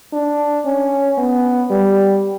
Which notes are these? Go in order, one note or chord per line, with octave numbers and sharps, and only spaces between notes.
D4
C#4
B3
G3